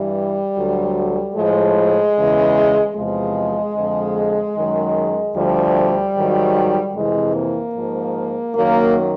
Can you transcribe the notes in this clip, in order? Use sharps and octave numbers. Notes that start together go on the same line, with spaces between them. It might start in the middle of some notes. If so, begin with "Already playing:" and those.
Already playing: G2 E3 G3
D2 D3 F#3
A2 F3 G#3
E2 C#3 E3
E2 C3 F3 G#3
F2 D3 F3
F#2 D#3 F#3
D2 D3 F3 G3
G#2 D#3 F#3
F2 C3 E3 G#3
A#3
G#2 F3
F#2 D#3 F#3 A#3